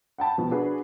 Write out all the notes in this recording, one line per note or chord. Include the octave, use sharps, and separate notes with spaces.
F#5 G5 A5 B5
B2 F3
D4 F#4 G#4 B4